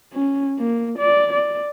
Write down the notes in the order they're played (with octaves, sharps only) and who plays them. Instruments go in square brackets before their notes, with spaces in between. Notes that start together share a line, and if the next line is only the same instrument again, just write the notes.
[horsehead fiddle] C#4
A#3
D5
D5